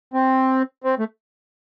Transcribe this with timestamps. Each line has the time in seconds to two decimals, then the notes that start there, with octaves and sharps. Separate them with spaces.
0.14 C4
0.84 C4
0.99 A3